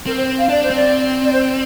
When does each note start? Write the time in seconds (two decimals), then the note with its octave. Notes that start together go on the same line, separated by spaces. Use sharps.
0.06 C4 A#4
0.18 C5
0.39 F5
0.49 D4 D5
0.63 C5
0.70 C4
0.76 D5
1.24 D5
1.33 C5